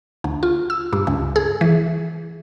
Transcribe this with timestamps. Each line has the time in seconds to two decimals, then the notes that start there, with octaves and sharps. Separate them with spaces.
0.24 D2
0.43 F4
0.70 E6
0.93 G2
1.07 C#2
1.36 G#4
1.61 E3